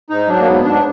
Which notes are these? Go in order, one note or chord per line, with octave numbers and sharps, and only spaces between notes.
G#2 D#4
F#3 D4
A#3
G#2 B3
G#2 D4